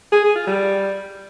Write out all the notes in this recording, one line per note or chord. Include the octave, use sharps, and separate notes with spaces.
G#4
G#4
F4
G3